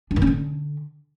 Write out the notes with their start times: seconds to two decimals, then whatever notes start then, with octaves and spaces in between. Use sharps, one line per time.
0.11 D4
0.16 D#3
0.22 C#4
0.27 D3